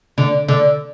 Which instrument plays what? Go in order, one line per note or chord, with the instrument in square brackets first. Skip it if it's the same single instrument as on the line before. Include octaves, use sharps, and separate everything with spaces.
[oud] D3
D3